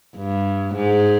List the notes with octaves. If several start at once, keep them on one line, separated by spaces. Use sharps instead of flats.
G2
G#2